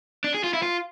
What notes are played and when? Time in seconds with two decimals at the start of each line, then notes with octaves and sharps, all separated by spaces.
0.24 D4
0.34 G#4
0.44 F4
0.54 E4
0.63 F4